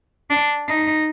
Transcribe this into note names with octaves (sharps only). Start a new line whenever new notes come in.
D4
D#4